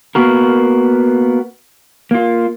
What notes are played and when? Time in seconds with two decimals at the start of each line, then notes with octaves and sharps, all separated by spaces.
0.15 A#3 B3 F#4 A#4
2.11 A#3 F4